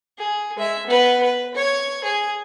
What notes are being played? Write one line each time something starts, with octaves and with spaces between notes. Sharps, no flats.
G#4
G#3 E5
B3 B4
B4
C#5
G#4